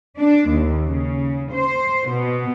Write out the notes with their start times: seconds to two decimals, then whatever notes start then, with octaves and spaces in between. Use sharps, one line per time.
0.18 D4
0.49 D#2
0.85 C#3
1.52 C5
2.08 B2